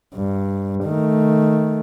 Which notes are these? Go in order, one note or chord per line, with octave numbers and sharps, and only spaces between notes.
G2
D#3 A3